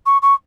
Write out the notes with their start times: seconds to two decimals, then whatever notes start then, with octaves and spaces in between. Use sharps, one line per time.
0.06 C#6
0.22 C#6